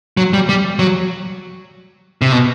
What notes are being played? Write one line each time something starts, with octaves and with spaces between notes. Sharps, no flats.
F#3
G3
G3
F#3
C3
B2